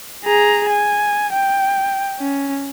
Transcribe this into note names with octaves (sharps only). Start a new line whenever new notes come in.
G#4 A#5
G#5
G5
C#4